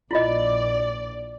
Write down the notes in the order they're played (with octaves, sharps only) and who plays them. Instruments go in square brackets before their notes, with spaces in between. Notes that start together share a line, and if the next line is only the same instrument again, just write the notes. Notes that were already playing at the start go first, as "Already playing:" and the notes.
[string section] A#1 D5 [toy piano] E4 F4 D#5